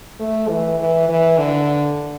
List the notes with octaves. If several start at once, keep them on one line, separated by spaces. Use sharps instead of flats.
A3
E3
E3
E3
D3